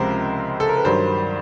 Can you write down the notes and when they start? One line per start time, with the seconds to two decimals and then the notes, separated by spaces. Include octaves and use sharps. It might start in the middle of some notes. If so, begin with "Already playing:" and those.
Already playing: C#2 C3 F3 G#3 A#4 C5
0.60 A4
0.69 A#4
0.76 B4
0.85 G2 D#3 F#3 C5